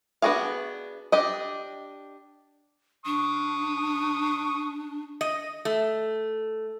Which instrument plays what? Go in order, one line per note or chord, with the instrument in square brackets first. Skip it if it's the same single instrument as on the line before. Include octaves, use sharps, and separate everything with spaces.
[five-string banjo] B3 D4 F#4 G#4 F5
D4 G4 D#5
[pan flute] D4 [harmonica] C#6 D#6
[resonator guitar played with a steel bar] D#5
A3